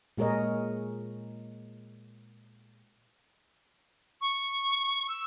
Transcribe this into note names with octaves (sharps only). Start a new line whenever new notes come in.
A#2 G#3 G#4 A#4 C#5 D#5
C#6
E6